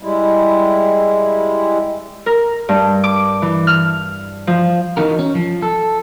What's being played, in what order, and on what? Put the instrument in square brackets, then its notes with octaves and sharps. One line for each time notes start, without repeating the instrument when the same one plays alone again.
[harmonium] G3 G#3 E4
[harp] A#4
G2
D6
E3
F6
F3
[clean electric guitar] E3 D#4 F#4 A#4
C#4
F3
A4